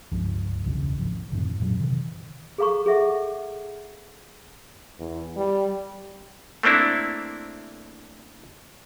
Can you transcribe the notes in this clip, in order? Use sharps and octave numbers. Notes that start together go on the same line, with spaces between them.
D1 C#2 G2 F3
D1 B1 E2 C#3
G#1 F3
G#1 F2 A2 D3
F#2 A#2 F#3
C3 D#3 E3
G#4 A4 F5 A#5 C#6
G#4 A4 D#5 E5 F#5
E2
G3
A3 A#3 C4 D4 E4